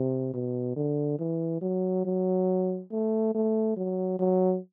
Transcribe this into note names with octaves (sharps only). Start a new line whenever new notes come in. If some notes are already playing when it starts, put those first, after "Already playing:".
Already playing: C3
B2
D3
E3
F#3
F#3
A3
A3
F#3
F#3